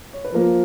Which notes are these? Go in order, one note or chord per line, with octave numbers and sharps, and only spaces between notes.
C#5
B4
F3 A#3 A#4